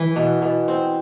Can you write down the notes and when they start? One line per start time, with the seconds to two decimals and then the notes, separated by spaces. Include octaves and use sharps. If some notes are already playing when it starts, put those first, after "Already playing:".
Already playing: E3
0.16 B2
0.42 B2
0.68 C4